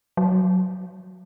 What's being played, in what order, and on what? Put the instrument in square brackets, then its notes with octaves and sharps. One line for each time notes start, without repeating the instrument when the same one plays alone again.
[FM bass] F#3